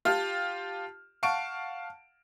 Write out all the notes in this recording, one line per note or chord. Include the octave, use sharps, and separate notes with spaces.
F4 G4 A5 F6
F5 F#5 A5 C#6 D7